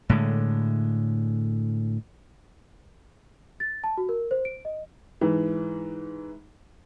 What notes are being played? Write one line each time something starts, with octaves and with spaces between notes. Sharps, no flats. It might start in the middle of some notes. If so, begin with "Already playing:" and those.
A2 D3 G#3
A6
A5
F#4
A#4
C5
D7
D#5
G#2 E3